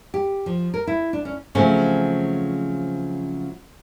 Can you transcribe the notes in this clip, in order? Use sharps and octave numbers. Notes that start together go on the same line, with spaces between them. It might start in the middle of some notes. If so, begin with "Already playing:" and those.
G4
F3
A#4
E4
D4
C#4
C#3 F3 F#3 A3 C4 C#4